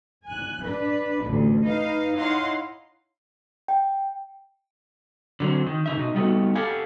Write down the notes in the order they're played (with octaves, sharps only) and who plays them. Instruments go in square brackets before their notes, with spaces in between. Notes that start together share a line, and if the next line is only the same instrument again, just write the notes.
[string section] G#5 F#6
D4 B4
A1 D2
D#4 B4 F5
D#4 E4 C#5 F5 F#5 C6
[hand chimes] G5
[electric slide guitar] D3 F#3 C4
D#3
C#3 D#4 E5
B2 D#4
G3 A3 B3 D#4 F#4
G4 A4 F5 F#5 G#5